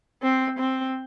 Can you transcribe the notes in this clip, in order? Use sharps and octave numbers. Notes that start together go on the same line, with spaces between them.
C4
C4